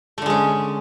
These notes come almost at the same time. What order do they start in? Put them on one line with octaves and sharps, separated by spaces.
A3 D3 G#3 C#4